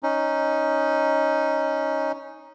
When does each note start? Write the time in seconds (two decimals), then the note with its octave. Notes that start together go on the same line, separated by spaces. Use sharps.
0.03 C#4 D#4